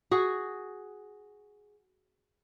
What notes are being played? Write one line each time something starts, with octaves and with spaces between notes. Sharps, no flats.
F#4 G#4